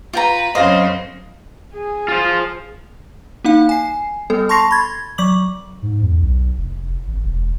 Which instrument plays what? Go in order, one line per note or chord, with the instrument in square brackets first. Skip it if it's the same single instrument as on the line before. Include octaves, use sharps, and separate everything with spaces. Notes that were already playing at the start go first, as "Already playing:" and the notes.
[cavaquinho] F4 G5 A#5 [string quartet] B4
[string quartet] F#2 C#3 C4 [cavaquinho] C5 [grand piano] D#5 F5 A#6
[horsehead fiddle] G#4
[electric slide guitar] F4 C5
[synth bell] A#3 D#4 F5
G#5 C7
G3 B3 A4
A5 C6 C#6 A#6 C7 F7
B5 G#6 A6
F#3 C#6 D6 F#7
[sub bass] G#2
E2
B1
F1
G#1
E1